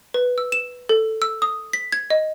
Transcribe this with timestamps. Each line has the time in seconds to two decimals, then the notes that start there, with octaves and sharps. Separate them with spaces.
0.14 B4
0.38 E6
0.52 E7
0.89 A4
1.22 E6
1.42 D#6
1.73 B6
1.92 G#6
2.10 D#5